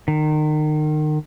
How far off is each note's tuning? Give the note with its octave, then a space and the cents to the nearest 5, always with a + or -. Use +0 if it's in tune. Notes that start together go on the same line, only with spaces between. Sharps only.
D#3 -30